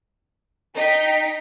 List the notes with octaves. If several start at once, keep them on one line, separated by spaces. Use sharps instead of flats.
D#4 G5 B6